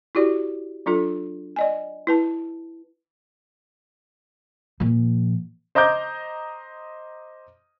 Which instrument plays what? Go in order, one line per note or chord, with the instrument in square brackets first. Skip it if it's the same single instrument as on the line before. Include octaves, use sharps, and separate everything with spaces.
[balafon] E4 F#4 G4 D5
F#3 D4 F4 A4
D5 D#5 G#5
E4 B4 A5
[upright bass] A#2 F3
[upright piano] C5 D#5 A#5 D6 G6